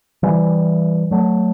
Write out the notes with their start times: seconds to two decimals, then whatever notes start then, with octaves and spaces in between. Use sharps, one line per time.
0.23 E3 G3
1.11 F#3 A3